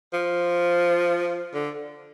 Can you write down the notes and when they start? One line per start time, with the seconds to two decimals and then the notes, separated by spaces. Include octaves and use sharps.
0.13 F3
1.54 D3